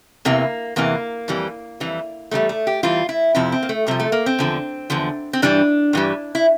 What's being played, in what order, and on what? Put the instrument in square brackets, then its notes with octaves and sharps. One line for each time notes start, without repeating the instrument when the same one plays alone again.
[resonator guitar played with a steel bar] E2 C3 E3 A#3
E2 C3 E3 A#3
F2 E3 G3
F2 E3 G3
E2 E3 G3 A3
A3
G4
E2 E3 G3 F4
E4
F2 C3 F3 E4
C4
A#3
A3
F2 C3 F3 G3
A3
A#3
C4
E2 D3 F3
E2 D3 F3
C4
G2 E3 G3 D4
G2 E3 G3
E4